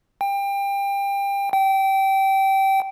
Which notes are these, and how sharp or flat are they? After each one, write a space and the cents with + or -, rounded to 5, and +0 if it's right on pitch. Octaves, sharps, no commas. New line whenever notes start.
G5 +25
G5 -20